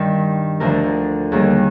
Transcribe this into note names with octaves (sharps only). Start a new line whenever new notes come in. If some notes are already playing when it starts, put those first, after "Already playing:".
Already playing: G2 D#3 G3
D2 D3 F3 A#4
D#2 D#3 G3 G#4